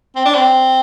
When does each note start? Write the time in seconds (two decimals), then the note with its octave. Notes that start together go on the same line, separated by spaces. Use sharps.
0.16 C4
0.25 D4
0.35 C4